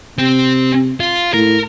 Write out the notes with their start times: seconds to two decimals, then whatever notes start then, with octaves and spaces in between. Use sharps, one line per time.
0.18 C3 C4
1.00 F4
1.34 A2 A#4